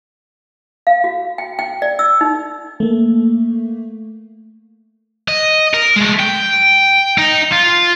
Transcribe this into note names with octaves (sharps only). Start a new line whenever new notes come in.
F5
F#4
G5
G5
D5
E6
D#4
A3 A#3
D#5
A#4
G#3 A3
G5
D#4
F4